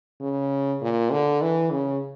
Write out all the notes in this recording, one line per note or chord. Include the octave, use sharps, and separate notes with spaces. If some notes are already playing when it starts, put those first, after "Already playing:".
C#3
A#2
D3
E3
C#3